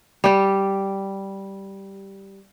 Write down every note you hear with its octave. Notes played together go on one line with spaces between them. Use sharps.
G3 G4